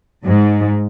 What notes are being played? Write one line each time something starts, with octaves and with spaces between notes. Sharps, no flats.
G#2